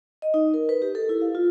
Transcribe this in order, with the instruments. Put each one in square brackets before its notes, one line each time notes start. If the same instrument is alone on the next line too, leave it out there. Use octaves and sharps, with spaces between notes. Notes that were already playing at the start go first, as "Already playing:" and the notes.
[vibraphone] D#5
D#4
A#4
B4
G4
A4
E4
F5
F4